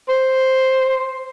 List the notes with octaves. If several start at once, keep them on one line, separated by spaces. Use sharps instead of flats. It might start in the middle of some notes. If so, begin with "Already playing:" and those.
C5